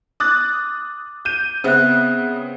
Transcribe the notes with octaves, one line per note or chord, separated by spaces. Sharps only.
D6 D#6 F#6 A6
G6 D#7
C#3 B3 C4 C5 E5 F#6